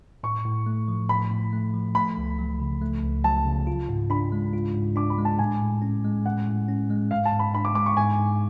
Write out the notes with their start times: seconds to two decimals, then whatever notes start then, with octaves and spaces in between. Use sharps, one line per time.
0.23 A2 C#6
0.45 A2
0.66 A3
0.88 F3
1.09 A2 B5
1.31 A2
1.53 A3
1.74 F3
1.95 A3 B5
2.18 C#2
2.39 F#3
2.60 C#3
2.81 A3
3.03 C#2
3.24 F#3 A5
3.45 C#3
3.67 F4
3.89 G#2
4.10 D4 B5
4.32 G#3
4.53 F4
4.74 G#2
4.96 D4 D6
5.10 B5
5.18 G#3
5.25 A5
5.39 A2 G#5
5.61 A2
5.82 C#4
6.04 G#3
6.25 A2 F#5
6.47 A2
6.68 C#4
6.90 G#3
7.11 G#2 F5
7.25 A5
7.32 G#2
7.39 B5
7.54 D4 B5
7.65 D6
7.75 G#3 D6
7.86 C#6
7.97 G#2 G#5
8.19 G#2